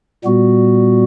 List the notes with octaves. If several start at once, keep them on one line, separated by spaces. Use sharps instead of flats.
A#2 G3 B3 F#4